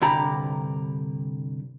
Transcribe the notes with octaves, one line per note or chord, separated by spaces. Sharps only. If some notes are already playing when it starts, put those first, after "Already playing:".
C2 G2 D3 G4 A#5 B5